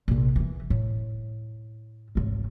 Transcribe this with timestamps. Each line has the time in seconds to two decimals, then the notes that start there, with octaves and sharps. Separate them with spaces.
0.08 A#1 C3
0.36 E3 B3
0.70 A2
2.15 G#1 C#2